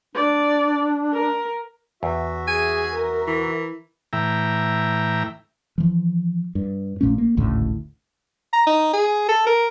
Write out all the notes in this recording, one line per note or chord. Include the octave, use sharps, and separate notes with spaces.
D4 D5
A#4
E2 F#4 E5
G#4 G#5
A#4
E3
A2 E3 E5 G5 A#5
E3 F3
G2
A#1 A#2 A3 C#4
A#3
G#1 D2 A2 C#3
A#5
D#4
G#4
A4
A#4